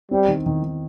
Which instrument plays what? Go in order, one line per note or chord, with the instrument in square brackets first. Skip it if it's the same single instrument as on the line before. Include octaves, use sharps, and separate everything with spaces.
[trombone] G3 [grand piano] C4
[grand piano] D#3
D#3
D#3